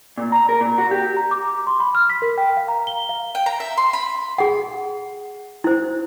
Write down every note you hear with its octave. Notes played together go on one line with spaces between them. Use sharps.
A#2
A#5
A#4
A#2
F#4
G4
A#5
D6
C6
B5
F6
B6
A#4
G5
F5
A#5
G7
F5
G5
A#5
E5
C6
B5
G#4 F#5
E4 C5